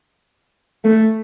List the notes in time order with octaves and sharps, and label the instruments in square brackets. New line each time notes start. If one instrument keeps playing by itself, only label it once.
[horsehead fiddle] A3